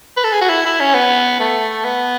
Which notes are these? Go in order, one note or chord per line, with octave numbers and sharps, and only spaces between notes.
B4
A4
G#4
F#4
E4
E4
C#4
B3
A3
B3